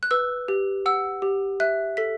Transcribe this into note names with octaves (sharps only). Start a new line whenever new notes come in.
F#6
B4 E6
G4
F#5 E6
G4
E5 F#6
A4 B6